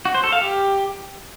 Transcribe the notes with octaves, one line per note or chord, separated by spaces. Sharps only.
F#4
C5
A4
F5
G4